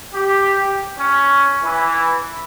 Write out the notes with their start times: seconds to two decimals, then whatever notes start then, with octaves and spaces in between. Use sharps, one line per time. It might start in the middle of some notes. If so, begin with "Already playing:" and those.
0.14 G4
0.98 C#4
1.63 E3